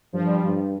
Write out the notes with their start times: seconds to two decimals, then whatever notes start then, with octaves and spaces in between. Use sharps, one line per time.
0.13 G2 F3
0.25 G3
0.37 F3
0.43 G2